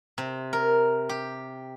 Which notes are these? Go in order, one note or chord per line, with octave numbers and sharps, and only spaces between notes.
C3
A#4
G4